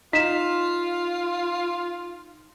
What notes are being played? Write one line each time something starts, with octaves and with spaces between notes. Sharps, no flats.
D#4 F4 B6 E7